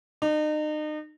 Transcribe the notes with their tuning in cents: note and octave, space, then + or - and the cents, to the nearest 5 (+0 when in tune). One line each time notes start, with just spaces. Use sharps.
D#4 -35